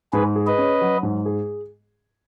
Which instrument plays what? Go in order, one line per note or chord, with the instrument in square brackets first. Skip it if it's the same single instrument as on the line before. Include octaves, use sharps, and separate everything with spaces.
[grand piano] G#2 [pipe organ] G#4 B4
[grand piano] G#4
[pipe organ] B4 D#5
[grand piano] C#4
F#3
G#2
G#4